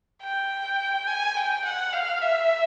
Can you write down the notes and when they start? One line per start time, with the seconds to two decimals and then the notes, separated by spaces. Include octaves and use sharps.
0.22 G5
1.07 G#5
1.37 G5
1.65 F#5
1.93 F5
2.21 E5